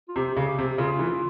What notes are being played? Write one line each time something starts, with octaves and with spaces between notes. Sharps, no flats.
F4
C3 G4
C#3
G4
C3
C#3 F4
E3